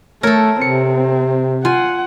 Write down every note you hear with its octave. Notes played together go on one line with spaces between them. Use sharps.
A3 A4 A#4 C#5
C3 C4 C#7
F4 F#5 G#5